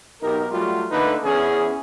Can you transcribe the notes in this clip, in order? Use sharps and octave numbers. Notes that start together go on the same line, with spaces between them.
B1 D#4 G4 A#4
F#3 G3 A3 F4 F#4
D3 A3 A#3 D#4 B4
E2 C#4 G#4